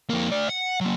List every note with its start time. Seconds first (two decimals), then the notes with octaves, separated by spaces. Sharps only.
0.10 F2 A#3
0.30 A3 D5
0.49 F#5
0.81 F#3 A#3